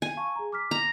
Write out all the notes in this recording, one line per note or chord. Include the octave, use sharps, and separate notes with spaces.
G#5
F5 A5 C#6
G#4 A#5
D6 F6 B6
A#5